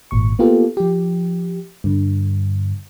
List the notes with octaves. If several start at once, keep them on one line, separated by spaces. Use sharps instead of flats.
G#1 A#2 C#6
A#3 B3 F4 G4 A4
F3 G4
G2 D3